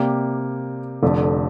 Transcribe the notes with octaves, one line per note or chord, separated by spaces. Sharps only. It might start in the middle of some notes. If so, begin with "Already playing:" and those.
Already playing: C3 A#3 G4 D5
F1 F2 D3